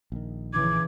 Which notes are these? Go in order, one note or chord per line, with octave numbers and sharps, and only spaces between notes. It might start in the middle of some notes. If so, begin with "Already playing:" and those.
A#1 D#3
C#3 E3 D6 G#6